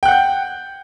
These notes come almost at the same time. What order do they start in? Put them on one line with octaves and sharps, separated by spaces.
G5 F#6 F#5 G6